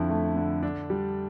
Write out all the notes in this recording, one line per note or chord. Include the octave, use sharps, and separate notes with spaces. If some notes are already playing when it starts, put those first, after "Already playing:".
Already playing: F2 D3 E4
A3
D3
D4
G3